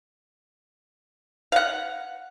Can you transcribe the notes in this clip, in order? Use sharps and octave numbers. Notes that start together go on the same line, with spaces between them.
F5 F#5